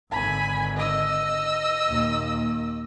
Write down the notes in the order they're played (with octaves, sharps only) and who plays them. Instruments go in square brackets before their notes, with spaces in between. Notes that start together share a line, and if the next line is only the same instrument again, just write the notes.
[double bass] G#1 D3 [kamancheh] G#5 B5
[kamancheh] D#5 E6
[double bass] D#2 A#2